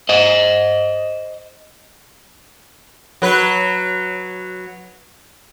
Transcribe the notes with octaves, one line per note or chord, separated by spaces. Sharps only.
C5 D#5
F#3 B4